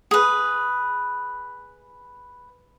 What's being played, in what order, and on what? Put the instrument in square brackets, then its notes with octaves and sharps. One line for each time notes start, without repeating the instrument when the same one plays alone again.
[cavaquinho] G#4 B4